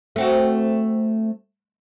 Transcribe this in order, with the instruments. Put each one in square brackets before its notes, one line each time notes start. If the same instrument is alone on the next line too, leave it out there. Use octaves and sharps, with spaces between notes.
[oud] A3 C4 F#4